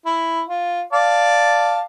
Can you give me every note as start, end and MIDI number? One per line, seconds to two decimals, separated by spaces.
0.06 0.42 64
0.48 0.81 65
0.93 1.81 74
0.93 1.81 77
0.93 1.81 81